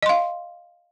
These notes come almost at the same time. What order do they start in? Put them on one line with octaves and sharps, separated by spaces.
D#5 C6 F5